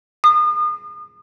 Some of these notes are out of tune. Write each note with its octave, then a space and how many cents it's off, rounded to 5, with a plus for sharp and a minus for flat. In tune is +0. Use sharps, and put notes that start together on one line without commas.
D#6 -40